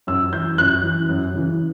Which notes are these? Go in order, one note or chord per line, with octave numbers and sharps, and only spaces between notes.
F#2 E6
E3 G6
F#2 F#6
E3
F#2
C#3 E3